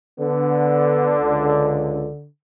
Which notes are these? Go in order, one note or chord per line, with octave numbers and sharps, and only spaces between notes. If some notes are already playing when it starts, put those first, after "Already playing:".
D3 B3
C#2